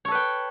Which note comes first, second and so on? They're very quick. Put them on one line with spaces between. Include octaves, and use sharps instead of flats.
C#5 A4 B4 G5